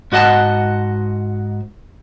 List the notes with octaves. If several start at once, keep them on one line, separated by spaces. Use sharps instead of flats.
G#2 F#4 D#5 F#5 A5